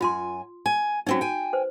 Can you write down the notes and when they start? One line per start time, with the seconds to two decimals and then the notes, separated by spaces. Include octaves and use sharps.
0.01 F#2 F4 G#5 C6
0.66 G#5
1.07 F#3 C4 C#4 D#4 F#4
1.21 G5 G#5
1.53 B4 C5